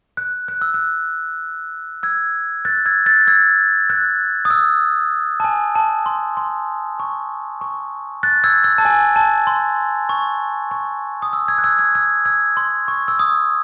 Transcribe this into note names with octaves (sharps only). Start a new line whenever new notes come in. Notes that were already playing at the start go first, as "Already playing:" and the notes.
F#6
F#6
E6
F#6
E6 G#6
F#6 A6
E6 G#6
F#6 A6
E6 G#6
F#6
D#6
E6
A5
G#5
A5
C6
C6
C#6
C#6
F#6 A6
E6 G#6
E6
A5
G#5
A5
C6
C#6
C#6
D#6
E6
E6 G#6
F#6
E6 G#6
E6 G#6
E6 G#6
E6 G#6
C6
C#6
E6
D#6